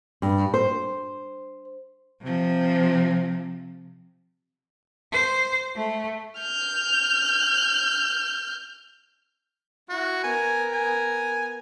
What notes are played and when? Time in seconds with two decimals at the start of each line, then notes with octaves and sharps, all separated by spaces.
0.22 G2
0.54 C5
2.22 C3 F3
5.12 C5
5.76 A3
6.40 F6 G6
9.90 E4 F#4
10.24 B3 A#4 G#5
10.73 G#5